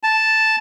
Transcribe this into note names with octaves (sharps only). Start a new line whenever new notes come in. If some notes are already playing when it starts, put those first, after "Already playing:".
A5